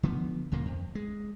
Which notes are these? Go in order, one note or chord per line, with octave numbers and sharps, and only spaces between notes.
D3 F3 B3
D2 A#2 C#3 A#3
F2
G#3